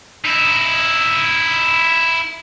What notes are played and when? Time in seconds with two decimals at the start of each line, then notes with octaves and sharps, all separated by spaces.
0.25 D#4 E4